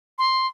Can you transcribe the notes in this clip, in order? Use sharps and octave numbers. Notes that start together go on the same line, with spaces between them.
C6